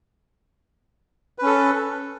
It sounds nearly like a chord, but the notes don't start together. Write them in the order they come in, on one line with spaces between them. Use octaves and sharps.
B4 C#4 A4